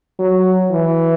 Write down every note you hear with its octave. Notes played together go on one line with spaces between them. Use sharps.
F#3
E3